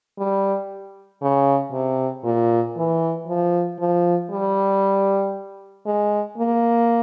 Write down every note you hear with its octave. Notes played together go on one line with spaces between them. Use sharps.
G3
C#3
C3
A#2
E3
F3
F3
G3
G#3
A#3